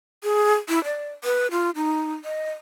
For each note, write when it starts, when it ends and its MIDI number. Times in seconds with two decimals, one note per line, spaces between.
0.24 0.54 68
0.69 0.83 64
0.84 1.09 74
1.24 1.47 71
1.51 1.71 65
1.75 2.14 63
2.24 2.50 75